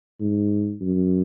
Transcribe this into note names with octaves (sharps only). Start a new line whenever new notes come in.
G#2
F#2